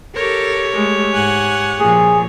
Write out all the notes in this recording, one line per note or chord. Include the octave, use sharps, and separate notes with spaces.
G4 A4 A#4 C#5
G#3 A3
G#2 F#5 G#5
A#2 F3 G#4